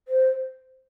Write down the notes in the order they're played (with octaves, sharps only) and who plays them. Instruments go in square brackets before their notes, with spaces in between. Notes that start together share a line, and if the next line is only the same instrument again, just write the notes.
[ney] C5